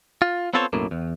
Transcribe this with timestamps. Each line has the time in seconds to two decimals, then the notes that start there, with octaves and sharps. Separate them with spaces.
0.22 F4
0.54 B3 C4 F4 A4 C5 C#5
0.73 B1 F#2 A2 A#3
0.91 E2